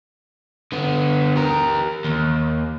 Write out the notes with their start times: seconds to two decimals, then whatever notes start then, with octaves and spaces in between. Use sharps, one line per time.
0.72 D3 B3
1.36 G4 A#4
2.04 D#2